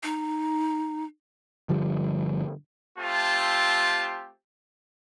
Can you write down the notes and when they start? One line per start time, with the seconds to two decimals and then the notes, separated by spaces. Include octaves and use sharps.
0.03 D#4
1.69 G1 D3 F3 G3
2.98 A3 C4 F4 G4 A5